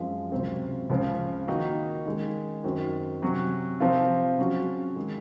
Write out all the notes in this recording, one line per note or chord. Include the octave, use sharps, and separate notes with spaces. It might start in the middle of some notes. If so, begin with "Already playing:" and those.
Already playing: F#2 F3 G#3 C4 F4
C#2 C3 F#3 C4
C#2 C#3 F3 C4
D#3 A#3 D#4 F#4
D#3 G#3 C#4 G#4
F#2 D#3 F#3 C4 F#4
C3 F#3 C#4 F#4
C3 F3 C4 F4
C#3 F#3 C#4 F#4
D#3 G#3